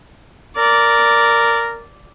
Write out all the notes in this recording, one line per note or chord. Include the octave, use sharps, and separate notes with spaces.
A#4 D5